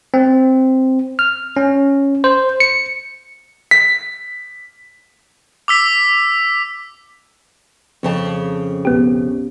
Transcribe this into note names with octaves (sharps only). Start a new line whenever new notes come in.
C4
F6
C#4
C5
C#7
B6
D6 E6 B6
F2 C#3 A5
B1 B3 G4